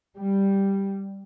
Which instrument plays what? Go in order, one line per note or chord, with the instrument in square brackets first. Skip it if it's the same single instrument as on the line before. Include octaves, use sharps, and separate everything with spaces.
[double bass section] G3